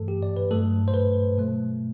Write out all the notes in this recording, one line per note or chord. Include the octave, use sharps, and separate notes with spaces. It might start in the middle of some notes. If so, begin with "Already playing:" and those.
Already playing: G2 E3 A3 A4
G4
D5
B4
G2 F#3 A3 A4
C5
B4
B2 F#3 A3